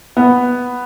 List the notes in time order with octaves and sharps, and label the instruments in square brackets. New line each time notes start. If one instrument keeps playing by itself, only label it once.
[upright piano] B3